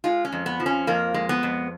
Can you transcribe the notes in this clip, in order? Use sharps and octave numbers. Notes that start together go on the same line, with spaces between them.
G#3 F4
C#4
F2
B3
F3
C#4
F2 A#3
G#3
B3
F2